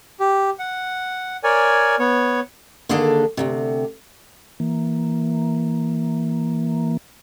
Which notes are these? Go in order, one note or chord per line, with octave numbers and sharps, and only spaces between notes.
G4
F#5
A#4 C#5 D5 G#5
B3 C#5
D3 D#3 A#3 D4 G#4 A4
D2 G2 C3
E3 A#3